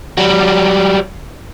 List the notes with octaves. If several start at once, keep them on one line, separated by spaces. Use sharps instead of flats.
F#3 G3